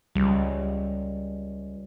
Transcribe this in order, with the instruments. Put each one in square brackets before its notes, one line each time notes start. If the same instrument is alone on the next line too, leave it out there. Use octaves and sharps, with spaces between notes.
[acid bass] C#2 [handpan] G3